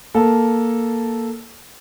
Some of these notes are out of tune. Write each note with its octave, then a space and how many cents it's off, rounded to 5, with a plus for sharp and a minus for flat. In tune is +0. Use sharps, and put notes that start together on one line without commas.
A#3 +0 A4 -5